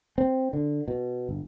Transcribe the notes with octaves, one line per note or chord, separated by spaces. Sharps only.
C4
D3
B2
G1